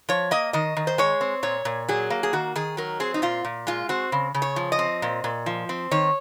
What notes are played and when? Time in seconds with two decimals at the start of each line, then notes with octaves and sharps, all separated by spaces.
0.09 F3 C#5
0.31 A#3 D#5
0.53 D#3 D#5
0.77 D#3
0.87 C5
0.98 G#3 C#5
1.21 C4
1.43 A#2 C#5
1.65 A#2
1.88 F#3 G#4
2.10 A#3
2.23 G#4
2.33 D#3 F#4
2.56 D#3 G#4
2.77 F#3 A#4
3.00 C4 G#4
3.14 D#4
3.22 A#2 F4
3.45 A#2
3.67 G#3 F4
3.89 C4 F#4
4.12 C#3
4.34 C#3
4.42 C#5
4.56 F3
4.72 D#5
4.79 C4
5.02 A#2
5.24 A#2
5.46 F3
5.69 C4
5.91 D#3 C#5